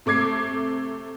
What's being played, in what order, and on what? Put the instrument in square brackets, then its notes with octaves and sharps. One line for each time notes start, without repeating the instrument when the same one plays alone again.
[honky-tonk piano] C3 A3 D6 G#6 C7